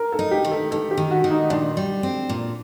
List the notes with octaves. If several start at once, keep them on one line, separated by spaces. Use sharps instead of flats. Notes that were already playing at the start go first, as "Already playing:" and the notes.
Already playing: A#4
A4
D#4
G4
D#3
A4
D#3 A4
G4
D#3
F#4
D#3
D#4
A#2 D4
G3
C4
A#2